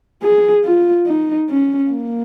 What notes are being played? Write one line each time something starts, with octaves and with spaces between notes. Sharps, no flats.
G#4
F4
D#4
C#4
A#3